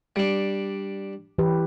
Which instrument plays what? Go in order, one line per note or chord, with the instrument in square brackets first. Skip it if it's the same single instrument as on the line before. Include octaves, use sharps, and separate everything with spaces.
[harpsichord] G3 D4
[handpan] E3 G4 B4